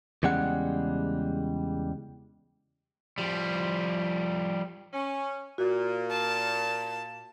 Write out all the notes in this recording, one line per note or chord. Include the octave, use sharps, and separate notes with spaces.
E2 C#3 G3 G#3 F#5
F3 G3
C#4
A#2 F#4
A5